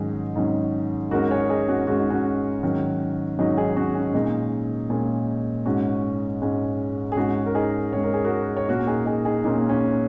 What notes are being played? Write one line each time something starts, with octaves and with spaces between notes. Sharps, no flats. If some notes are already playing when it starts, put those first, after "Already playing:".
Already playing: G#2 D#3 F#3 C#4 D#4 G#4
G#2 D#3 F#3 C#4
G#2 G#3 C#4 F#4 A#4
G#4 C#5
D#4 G#4
C#4 F#4
G#2 G#3 C#4 F#4
D#4
C#4 F#4
G#2 D#3 F#3 C#4
G#2 D#3 F#3 C#4 D#4
D#4 G#4
C#4 F#4
C#4
A#2 G#3 C#4 D#4
A#2 G#3 C#4
G#2 G#3 C#4 F#4
G#2 G#3 C#4
G#4
G#2 G#3 C#4 F#4
A#4
D#4 G#4
G#2 G#3 C#4 C#5
A#4
G#4
F#4 A#4
C#5
A#2 A#3 C#4 F#4 A#4
D#4 G#4
D#4 G#4
D#4 G#4
A#2 A#3 C#4 D#4
C#4